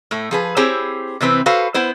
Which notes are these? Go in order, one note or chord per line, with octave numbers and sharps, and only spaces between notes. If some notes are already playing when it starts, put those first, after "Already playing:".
A2 A3
F3 G#4 B4
C4 E4 G4 G#4 C5 C#5
C3 E3 C4 B4
F#4 A4 B4 C5 F5
B3 E4 C5